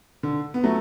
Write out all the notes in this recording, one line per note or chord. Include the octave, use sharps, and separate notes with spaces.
D3
B3
F#3 A3